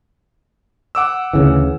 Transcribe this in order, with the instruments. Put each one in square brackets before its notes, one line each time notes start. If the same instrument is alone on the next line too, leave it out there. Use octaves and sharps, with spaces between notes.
[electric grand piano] F#5 D6 E6
[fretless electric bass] D2 C#3 E3